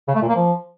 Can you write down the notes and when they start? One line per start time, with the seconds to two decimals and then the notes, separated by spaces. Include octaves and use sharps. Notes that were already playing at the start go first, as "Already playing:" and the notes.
0.08 C#3
0.15 A3
0.22 A#2
0.29 A#3
0.35 F3